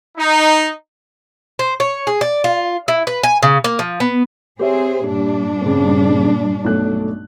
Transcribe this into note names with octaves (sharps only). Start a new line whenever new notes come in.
D#4
C5
C#5
G#4
D5
F4
E4
B4
G#5
C#3
A#3
F3
B3
C4 G4 G#4 C5 C#5 E5
G2 A#2 D4
C#3 C4
B1 A3 F#6